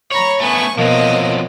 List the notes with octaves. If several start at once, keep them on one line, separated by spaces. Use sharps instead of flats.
C#5 A#5 B5 C#6
A3 B3 G#5 C#6
B2 F3 F#3 A#3 C4 D#5